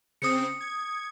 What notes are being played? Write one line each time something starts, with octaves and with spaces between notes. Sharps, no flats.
C#3 C4 D#6 C#7
G#6